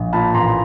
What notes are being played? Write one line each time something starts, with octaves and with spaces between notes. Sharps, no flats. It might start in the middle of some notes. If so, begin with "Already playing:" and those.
Already playing: A#1
A#2 A5 B5
A1 A#5 C6